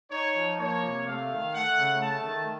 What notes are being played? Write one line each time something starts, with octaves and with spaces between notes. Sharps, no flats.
D#4 C#5
F3
A#3 C#5
C3
A3 F5
D#3
A3 F#5
C#3
A3 A5
D#3